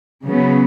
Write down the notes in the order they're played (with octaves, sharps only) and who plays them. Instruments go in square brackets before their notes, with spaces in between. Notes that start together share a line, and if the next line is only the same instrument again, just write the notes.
[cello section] C#3 F#3 B3